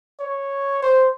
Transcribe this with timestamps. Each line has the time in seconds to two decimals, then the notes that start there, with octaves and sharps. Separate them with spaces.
0.20 C#5
0.82 C5